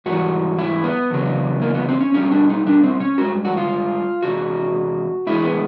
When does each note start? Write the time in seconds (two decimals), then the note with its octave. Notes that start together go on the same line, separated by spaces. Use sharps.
0.06 G#2 E3 G3 F#4
0.59 E4
0.84 B3
1.10 E2 C#3 F#3
1.62 A#3
1.75 B3
1.89 C4
2.00 C#4
2.14 B2 G3 C#4
2.31 D4
2.49 D#4
2.66 D4
2.83 C4
3.00 C#4
3.18 G2 D#3 G#3 F#4
3.45 F#4
3.57 F4
4.22 E2 C3 G#3 F#4
5.27 A2 E3 G#3 E4
5.44 B3